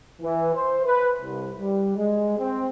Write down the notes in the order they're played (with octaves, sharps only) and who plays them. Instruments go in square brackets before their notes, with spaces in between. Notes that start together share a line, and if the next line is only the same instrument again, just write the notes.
[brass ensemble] E3
C5
B4
C2
G3
G#3
C4